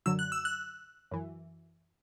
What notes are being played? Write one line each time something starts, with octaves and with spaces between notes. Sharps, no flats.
F#2 D3 F#3 E6
F#6
E6
F#6
F#2 E3